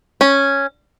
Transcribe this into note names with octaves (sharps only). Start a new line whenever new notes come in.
C#4